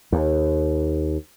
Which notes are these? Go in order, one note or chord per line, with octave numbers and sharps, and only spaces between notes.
D#2